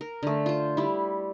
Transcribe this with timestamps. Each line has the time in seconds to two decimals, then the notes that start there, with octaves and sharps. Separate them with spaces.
0.01 A#4
0.23 D3 A3
0.46 F4 C5
0.77 G3 E4